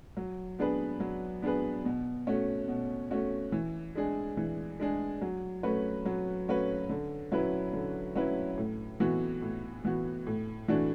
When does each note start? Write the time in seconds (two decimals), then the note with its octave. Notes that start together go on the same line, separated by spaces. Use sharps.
0.17 F#3
0.59 B3 D4 G#4 B4
1.00 F#3
1.42 B3 D4 G#4 B4
1.85 B2
2.27 A3 C#4 F#4
2.68 B2
3.11 A3 C#4 F#4
3.52 E3
3.95 G#3 D4 G#4
4.37 E3
4.80 G#3 D4 G#4
5.21 F#3
5.63 A3 C#4 F#4 B4
6.05 F#3
6.48 A3 C#4 F#4 B4
6.89 D3
7.32 F#3 C#4 E4 B4
7.73 D3
8.16 F#3 C#4 E4 B4
8.57 A2
9.00 E3 B3 F#4
9.42 A2
9.85 E3 B3 F#4
10.27 A2
10.68 E3 A3 D4 F#4